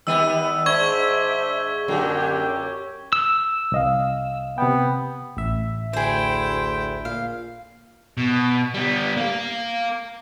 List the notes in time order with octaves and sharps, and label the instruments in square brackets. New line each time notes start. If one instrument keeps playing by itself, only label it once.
[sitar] D#3 G3 B3 [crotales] E6 D#7
[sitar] G#2 [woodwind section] D4 C5 E5 [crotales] C#6 G#6 G7
[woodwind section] F#2 G4 [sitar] A#2 D3 F#3
[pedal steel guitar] E6
[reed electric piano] C2 D#5 F5
[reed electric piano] C3 G5 [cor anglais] B3
[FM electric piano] A1 E5
[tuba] D2 [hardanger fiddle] E4 G5 [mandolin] G#4 C5
[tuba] A#2 [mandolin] F5
[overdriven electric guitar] B2
G3 B3
A#3 F5